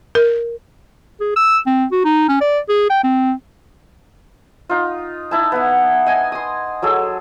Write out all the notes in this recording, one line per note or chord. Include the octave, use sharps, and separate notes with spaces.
A#4
G#4
E6
C4
F#4
D#4
C#4
D5
G#4
G5
C4
D#4 F4
D#4 E4 A5
B3 F#5
D#5 G#5
C6 D#6
F#3 G#4 A4